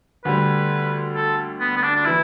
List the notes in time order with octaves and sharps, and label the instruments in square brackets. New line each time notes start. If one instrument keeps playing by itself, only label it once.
[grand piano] D2 D3 G3 [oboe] B4
[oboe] A4
B3
B3
D4
D4
[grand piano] E3 [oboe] E4